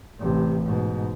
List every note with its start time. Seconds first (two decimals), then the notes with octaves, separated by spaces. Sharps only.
0.19 A1 C3
0.64 G#2 B2